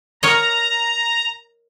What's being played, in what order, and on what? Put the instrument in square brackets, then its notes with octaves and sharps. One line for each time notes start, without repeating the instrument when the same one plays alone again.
[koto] A#4 C#5 D#5 [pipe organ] A#5